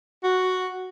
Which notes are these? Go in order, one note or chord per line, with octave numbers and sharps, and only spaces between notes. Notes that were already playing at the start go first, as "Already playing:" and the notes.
F#4